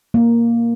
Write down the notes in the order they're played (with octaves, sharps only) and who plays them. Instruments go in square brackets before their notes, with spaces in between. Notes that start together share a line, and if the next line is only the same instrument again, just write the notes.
[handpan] A#3